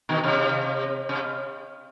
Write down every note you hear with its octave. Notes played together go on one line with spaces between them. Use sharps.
B2 D#3
C3
C3